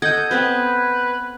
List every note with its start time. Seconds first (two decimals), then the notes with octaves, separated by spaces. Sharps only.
0.02 A4 D#5 F#5 G6 G#6
0.31 B3 C4 B4 C5